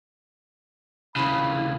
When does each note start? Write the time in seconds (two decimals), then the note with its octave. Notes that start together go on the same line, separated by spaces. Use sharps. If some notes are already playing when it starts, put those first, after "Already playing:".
1.16 D#2 C#3 E4 C5 B5